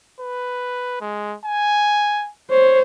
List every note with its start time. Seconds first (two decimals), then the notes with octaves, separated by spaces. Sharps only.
0.21 B4
1.01 G#3
1.45 G#5
2.51 C5 C#5